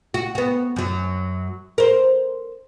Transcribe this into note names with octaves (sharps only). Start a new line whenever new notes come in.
F#4
B3 F#4
F#2 F#3
A#4 C5